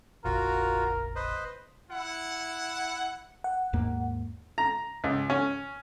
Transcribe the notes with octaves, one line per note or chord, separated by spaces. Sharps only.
F1 A#1 F4 F#4 A#4
B4 C5 D#5
E4 F#5
F#5
D#2 G#2 A#3
A#5
C#2
C#4